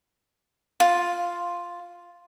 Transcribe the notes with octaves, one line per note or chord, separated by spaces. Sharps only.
F4